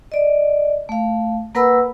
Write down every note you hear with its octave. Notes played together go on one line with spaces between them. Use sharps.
D5 D#5
A3 F5
A#3 A#4 B4 F#5 B5 E6